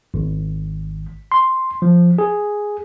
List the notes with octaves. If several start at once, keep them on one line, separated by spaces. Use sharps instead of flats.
G#1
C6
F3
G#4